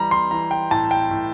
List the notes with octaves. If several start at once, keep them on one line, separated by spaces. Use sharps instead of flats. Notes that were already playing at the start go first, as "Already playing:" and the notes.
Already playing: E3 G3 A#5
C6
E3 A#5
G5
A2 A5
G5
A2